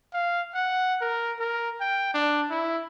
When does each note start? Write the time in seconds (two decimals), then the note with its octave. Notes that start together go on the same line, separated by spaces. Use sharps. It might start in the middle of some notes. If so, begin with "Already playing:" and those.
0.13 F5
0.54 F#5
1.01 A#4
1.39 A#4
1.81 G5
2.14 D4
2.50 E4